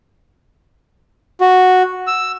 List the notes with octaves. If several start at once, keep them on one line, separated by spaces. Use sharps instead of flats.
F#4
E6